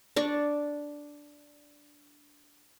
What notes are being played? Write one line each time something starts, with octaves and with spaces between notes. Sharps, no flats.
D4 D5 C#6